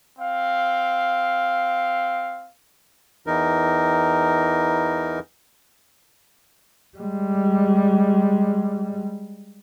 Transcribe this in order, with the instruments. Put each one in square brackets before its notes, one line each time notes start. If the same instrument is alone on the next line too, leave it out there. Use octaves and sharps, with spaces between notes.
[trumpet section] C4 F5
[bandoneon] E2 E3 D#4 A#4
[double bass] G3 G#3